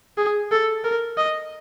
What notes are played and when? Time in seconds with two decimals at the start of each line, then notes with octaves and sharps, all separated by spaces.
0.17 G#4
0.51 A4
0.84 A#4
1.17 D#5